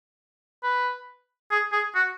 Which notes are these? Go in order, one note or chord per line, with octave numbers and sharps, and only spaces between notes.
B4
G#4
G#4
F#4